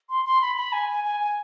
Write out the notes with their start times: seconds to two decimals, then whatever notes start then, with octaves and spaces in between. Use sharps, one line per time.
0.09 C6
0.25 C6
0.42 B5
0.57 B5
0.73 G#5
0.89 G#5
1.04 G#5
1.20 G#5